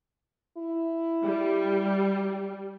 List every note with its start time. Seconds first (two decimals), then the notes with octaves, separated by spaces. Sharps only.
0.57 E4
1.23 G3